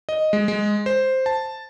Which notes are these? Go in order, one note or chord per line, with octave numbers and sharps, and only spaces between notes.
D#5
G#3
G#3
C5
A5